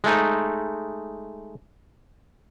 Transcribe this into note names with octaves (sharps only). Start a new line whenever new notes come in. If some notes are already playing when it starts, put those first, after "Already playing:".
G#3 A3 D#4